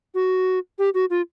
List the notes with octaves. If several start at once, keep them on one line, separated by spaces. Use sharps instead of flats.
F#4
G4
F#4
F4